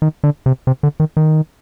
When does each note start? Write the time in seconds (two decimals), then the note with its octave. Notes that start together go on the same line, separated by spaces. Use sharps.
0.02 D#3
0.24 D3
0.46 C3
0.67 C3
0.83 D3
1.00 D#3
1.17 D#3